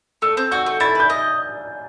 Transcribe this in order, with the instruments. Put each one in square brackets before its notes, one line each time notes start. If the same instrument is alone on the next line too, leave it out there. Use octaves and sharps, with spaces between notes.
[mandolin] A3 [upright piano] E6
[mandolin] C4
[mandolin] F#4 [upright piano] G6
[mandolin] A3
[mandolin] E4 [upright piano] A6
[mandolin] B4 [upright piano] G6
[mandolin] D#5